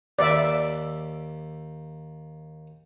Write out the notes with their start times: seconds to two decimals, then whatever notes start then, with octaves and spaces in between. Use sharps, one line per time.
0.19 D#2 D5 E5